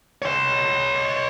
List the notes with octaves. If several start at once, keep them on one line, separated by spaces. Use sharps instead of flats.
C#5 C6